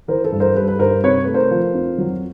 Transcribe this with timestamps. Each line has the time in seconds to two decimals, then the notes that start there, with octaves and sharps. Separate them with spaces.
0.08 E3 A#4 C5
0.24 A4 B4
0.32 G2
0.40 A#4 C5
0.55 G3 A4 B4
0.68 B4
0.79 G2 A#4 C5
1.03 C3 B4 C#5
1.24 A3 B4
1.34 A#4 C5
1.51 F3
1.74 F2
1.98 F#3